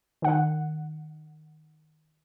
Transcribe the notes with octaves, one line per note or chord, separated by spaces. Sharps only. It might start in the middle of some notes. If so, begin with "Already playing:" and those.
D#3 F#5